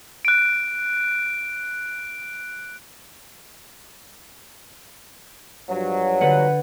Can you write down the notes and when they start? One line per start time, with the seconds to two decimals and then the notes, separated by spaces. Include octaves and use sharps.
0.25 F#6 D7
5.70 G2 F3 F#3
6.21 D3 B4 F#5